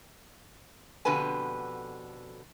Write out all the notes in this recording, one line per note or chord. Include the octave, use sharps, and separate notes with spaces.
F2 B2 D3 G4 B4 G#5